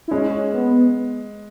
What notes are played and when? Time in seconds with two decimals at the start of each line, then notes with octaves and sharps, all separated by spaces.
0.08 E4
0.11 G#3 C#4
0.53 B3